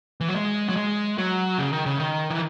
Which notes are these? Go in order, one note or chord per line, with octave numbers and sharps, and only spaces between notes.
E3
F#3
G#3
F#3
G#3
F#3
C#3
D#3
C#3
D#3
E3